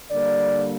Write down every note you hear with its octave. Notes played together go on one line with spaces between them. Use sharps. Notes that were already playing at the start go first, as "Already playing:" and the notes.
D3 G3 A#3 D5